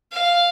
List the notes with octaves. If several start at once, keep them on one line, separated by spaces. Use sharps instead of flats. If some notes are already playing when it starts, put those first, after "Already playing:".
F5